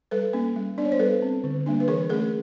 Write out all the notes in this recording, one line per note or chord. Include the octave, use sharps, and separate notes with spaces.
G3 A4 B4
A#3 C#4
G3
B3 D4 D5
C#5
C5
G3 A4 B4
C4
D3
G3 A#3 D4
B4
E3 G#4 A#4
A3 C#4 G#4 A#4